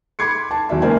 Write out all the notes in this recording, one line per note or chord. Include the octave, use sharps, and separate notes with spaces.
B5 C6 D6 G#6 C7 C#7
A5
E2 F#3 D5 E5
C#2 A#3 A#4 C5 D5 G#5